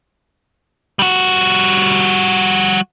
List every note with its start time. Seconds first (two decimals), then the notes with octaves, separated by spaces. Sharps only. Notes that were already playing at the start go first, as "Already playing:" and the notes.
0.99 G3 F#4